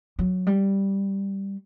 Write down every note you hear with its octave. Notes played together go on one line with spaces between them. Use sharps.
F#3
G3